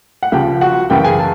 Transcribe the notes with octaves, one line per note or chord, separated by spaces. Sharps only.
F#5
C#2 C#3 F3 G4 G5
F#4 F#5
F#2 C#3 E3 G4 G5
G5
G#4 G#5
A5